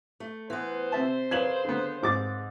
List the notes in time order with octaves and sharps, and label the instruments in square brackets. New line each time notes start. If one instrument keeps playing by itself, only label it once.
[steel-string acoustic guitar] A3
[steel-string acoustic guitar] E3 B3 [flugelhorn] C5
[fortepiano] C3 E5 A5
[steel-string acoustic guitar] C#3 A#4 B4 [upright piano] G#6 E7 F#7
[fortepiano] D3 B3
[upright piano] G#2 A6 [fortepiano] C4 D6